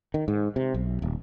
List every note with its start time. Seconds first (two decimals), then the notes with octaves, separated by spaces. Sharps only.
0.14 D#3
0.28 G#2
0.56 C3
0.74 B1
1.02 D#1